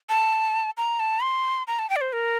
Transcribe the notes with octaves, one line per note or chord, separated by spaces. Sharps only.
A5
A#5
A5
C6
A#5
A5
G5
D5
C5
A#4